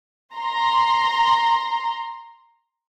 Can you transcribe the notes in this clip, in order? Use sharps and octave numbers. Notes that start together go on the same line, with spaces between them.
A#5 C6